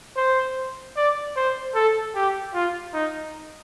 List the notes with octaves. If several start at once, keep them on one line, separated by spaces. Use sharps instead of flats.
C5
D5
C5
A4
G4
F4
D#4